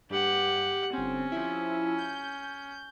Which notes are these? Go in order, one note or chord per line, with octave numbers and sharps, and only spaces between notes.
G2 G4 F#5
G1 C4 C#4
F3 E4
G6